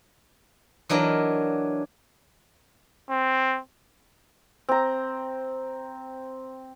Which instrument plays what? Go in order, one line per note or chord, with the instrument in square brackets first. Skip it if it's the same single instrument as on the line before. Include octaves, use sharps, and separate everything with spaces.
[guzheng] E3 F#3 D4 A#4 D#5
[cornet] C4
[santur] C4 A#5